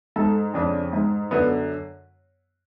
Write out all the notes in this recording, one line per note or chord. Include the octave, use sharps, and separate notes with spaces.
G#2 A4
F2 C#3 D4
G#2
F#2 D3 B3